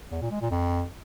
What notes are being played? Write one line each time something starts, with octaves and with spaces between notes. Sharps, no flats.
E2
A#2
G#3
A#2
F2